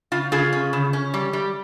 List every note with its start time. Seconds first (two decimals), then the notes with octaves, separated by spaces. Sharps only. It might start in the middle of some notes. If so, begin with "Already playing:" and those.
0.12 C#3 F4
0.32 C#3 F4 G#4
0.53 C#4
0.73 C#3
0.93 C#4
1.14 G3
1.33 G3